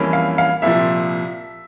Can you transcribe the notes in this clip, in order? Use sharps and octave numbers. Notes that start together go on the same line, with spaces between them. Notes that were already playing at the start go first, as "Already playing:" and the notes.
Already playing: F2 E3 G3 A#3 C#4
F5
F5
C2 A#2 F3 E5